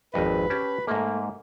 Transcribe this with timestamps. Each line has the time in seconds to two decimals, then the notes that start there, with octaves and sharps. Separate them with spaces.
0.14 G#1 F2 B4 D#5
0.50 C#4 G4 A5
0.87 G#2 A3 A#3